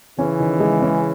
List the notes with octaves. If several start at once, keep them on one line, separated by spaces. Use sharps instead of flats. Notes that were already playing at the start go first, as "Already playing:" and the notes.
C#3 E3 C#4
D#3
G#3
C#4